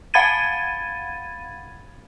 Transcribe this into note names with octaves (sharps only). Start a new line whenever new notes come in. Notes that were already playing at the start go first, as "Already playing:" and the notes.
F5 F#5 B5 G#6 A6 D#7